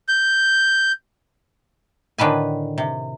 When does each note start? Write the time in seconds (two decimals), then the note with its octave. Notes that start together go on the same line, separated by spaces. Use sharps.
0.09 G6
2.18 A2 D3 D#3 B4 G#5
2.78 C3